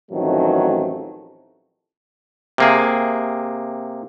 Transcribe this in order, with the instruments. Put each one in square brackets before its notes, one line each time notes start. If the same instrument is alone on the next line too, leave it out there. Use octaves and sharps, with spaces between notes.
[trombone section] A1 F2 D#3 F#3 A3
[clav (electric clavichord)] C3 A#3 G#4